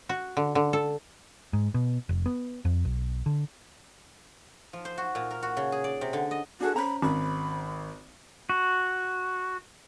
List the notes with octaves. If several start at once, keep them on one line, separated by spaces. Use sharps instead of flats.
F#4
D3
D3
A4
G#2
B2
F1
B3
F2
B1
D3
F3
C5
F#4
A#2
A#4
F#4
C#3
G#4
D5
C3
D3
D#5
D4 F#4 G#4 A4
C#4 C5 A#5 B5
G#1 B5
F#4